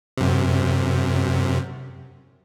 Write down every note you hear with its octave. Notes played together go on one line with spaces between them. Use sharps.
F#2 C3